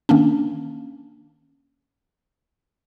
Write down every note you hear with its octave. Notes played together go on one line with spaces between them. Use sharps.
D#3 A#3 C#4 D4